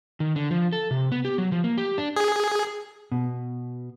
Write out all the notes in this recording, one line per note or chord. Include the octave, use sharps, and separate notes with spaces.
D#3
D3
F3
A4
C3
B3
G4
F#3
F3
A#3
G4
D4
G#4
B2